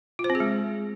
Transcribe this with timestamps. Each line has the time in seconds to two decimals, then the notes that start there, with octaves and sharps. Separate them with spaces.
0.19 F4
0.24 C5
0.30 C4
0.35 G#4
0.40 G#3